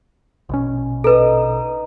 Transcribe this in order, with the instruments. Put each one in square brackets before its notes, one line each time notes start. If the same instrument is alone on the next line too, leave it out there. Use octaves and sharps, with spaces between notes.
[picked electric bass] A#1 B2 C#4
[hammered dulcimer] D#4 D#5 [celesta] A4 B4